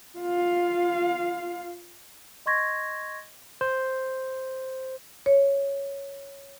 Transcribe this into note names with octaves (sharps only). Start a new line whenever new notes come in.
F4 F5
D#5 C6 C#6 G#6 A#6
C5
C#5